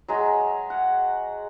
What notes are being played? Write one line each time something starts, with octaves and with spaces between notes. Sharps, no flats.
F#3 G#3 A#5
F#5